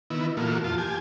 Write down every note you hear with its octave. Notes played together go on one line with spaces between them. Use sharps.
D#3 B3 E4
A#2 E3 A3 A#3 F4 F#4
F2 F4 A5
G4 G#5